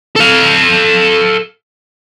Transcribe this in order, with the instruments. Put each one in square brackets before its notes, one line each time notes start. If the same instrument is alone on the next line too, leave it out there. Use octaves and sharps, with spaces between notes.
[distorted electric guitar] A4 F5